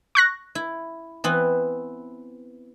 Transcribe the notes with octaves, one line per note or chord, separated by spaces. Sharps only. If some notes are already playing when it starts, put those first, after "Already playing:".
C#6 F#6 A#6
E4
E3 B3 C4